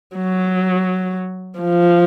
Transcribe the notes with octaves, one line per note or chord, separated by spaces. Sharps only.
F#3
F3